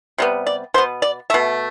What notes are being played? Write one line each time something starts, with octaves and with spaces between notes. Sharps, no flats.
C3 G3 B3
D5
B2 B3 C5
D5
B2 A3 E5